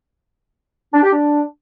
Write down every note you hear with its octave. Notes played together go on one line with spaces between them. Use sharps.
D4
G4
D4